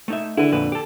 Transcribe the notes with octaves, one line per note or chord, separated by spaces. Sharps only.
A3 D#4 E5
D3 E4 B4
F2 A#2 B4
G4 A4